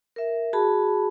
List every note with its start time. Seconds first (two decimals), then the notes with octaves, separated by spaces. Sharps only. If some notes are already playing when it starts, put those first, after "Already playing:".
0.16 A#4 E5
0.53 F#4 G#4 A5 B5